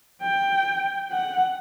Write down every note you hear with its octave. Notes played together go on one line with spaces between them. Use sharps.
G5
F#5